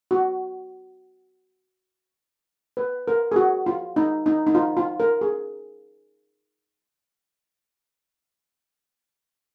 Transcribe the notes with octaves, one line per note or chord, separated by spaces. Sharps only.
F#4
B4
A#4
G#4
F#4
F4
D#4
D#4
D#4
F4
F4
A#4
G#4